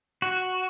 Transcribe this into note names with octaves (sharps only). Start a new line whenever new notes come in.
F#4